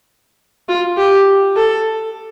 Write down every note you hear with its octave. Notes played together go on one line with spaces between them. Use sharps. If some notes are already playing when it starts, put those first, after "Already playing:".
F4
G4
A4